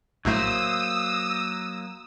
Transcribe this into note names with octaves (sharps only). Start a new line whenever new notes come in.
A#1 A2 F#3 A3 A#3 C5 D#6 E6